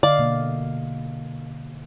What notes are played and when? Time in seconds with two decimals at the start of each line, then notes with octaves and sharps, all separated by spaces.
0.03 D3 D5 D#5 F5
0.18 B2 A#3